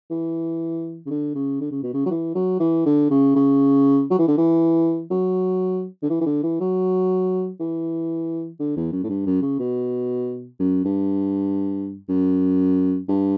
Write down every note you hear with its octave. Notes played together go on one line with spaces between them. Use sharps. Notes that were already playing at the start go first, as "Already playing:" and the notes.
E3
C#3
D3
C#3
D3
C#3
B2
C#3
F#3
E3
F#3
E3
D3
C#3
C#3
F#3
E3
D3
E3
F#3
D3
E3
E3
D3
E3
F#3
E3
D3
E2
F#2
A2
G2
F#2
C#3
B2
F#2
G2
F#2
G2